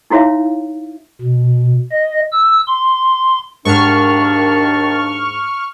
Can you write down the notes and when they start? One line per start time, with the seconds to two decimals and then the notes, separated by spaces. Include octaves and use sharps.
0.10 D#4 E4 F#4 C#5 E5 F5
1.21 B2
1.92 D#5
2.32 E6
2.68 C6
3.65 D#2 G#2 D#3 D4 C#6 F6